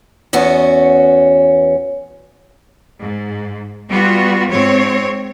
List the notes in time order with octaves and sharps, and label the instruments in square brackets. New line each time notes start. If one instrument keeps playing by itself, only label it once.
[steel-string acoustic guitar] E2 B3 C#4 F#4
[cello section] G#2
G3 B3 F4 F#4
G#2 C4 C#5